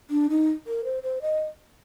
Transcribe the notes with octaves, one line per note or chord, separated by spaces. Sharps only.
D4
D#4
A#4
C5
C5
D#5